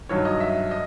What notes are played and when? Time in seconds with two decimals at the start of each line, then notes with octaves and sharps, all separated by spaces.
0.09 G2 D#3 F#3 C#5
0.25 D#5
0.40 E5
0.71 D#5